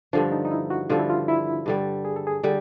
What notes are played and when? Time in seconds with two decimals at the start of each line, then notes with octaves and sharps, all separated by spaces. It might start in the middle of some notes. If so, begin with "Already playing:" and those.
0.13 G2 D3 F3 D4
0.32 D#4
0.45 D#4
0.51 E4
0.70 F#4
0.89 G2 D3 F3 F4
0.99 E4
1.10 F4
1.28 E4
1.66 G2 D3 G3
2.05 G#4
2.16 A4
2.27 G#4
2.43 D3 G3